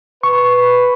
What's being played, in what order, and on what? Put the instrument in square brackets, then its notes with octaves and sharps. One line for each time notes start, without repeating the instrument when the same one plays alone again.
[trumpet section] B4 [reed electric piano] C#6